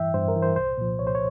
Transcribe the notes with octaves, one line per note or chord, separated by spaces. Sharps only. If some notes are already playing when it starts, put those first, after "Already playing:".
Already playing: G2 E3 E5 G5
G2 C5
A#4
E3
C5
C2 C5
A#2 F3
C2 C#5
C5
C#5